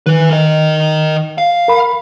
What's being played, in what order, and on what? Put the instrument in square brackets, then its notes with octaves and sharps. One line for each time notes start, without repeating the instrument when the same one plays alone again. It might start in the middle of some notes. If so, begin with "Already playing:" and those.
[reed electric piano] D#3 [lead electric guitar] E3 B4
[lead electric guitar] A#4 D#5
F5
[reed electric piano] A#4 B5